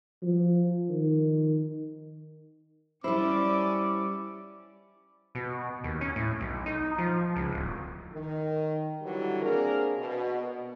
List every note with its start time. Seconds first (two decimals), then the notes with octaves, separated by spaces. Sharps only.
0.22 F3
0.89 D#3
3.04 G3 C#4 E4 C5 D5 D6
5.35 B2
5.84 D#2
6.01 C#4
6.16 A2
6.40 B1
6.66 D#4
6.98 F3
7.36 C#2
7.53 D1
8.13 D#3
9.02 D3 E3 F#3 G3
9.42 A#3 C4 D4 G#4 A#4
9.98 B2